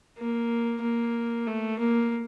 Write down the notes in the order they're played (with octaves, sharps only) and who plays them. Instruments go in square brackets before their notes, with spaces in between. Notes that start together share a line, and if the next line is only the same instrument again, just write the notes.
[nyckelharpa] A#3
A#3
A3
A#3